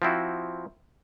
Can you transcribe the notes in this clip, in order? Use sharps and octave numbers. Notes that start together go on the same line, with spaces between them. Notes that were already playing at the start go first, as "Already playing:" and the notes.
F3 C4 E4 F#4